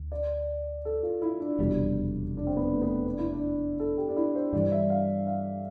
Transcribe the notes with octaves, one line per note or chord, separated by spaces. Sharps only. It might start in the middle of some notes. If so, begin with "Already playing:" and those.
Already playing: D2
D5
A4
F4
E4
D4
F1 E2 B2 G3
D4
C4
B3
A3
B3
D4
E4
D4
A4
G4
D4
E4
C5
G2 E3 G3 D5
E5
F5
F5